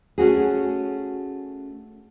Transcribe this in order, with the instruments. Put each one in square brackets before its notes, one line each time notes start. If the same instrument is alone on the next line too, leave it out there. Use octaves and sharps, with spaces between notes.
[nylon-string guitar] A3 C#4 F#4 G#4